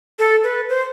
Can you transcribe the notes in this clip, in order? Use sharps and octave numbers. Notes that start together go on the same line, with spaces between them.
A4
B4
C5